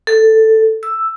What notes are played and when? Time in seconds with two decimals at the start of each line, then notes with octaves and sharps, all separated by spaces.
0.07 A4
0.83 E6